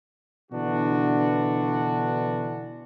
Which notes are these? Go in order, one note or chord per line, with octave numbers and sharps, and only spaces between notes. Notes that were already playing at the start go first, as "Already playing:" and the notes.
B2 D3 E3 D4 F#4